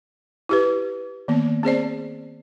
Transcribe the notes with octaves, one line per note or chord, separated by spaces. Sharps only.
E4 G4 B4
D#3 A#3 B3
C4 G#4 C5 D5